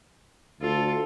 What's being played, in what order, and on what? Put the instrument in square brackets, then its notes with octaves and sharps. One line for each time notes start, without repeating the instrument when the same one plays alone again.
[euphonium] D2 [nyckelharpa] F4 A4